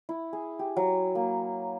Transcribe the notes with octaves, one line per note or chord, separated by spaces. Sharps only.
E4
G#4
G4
F#3
A#3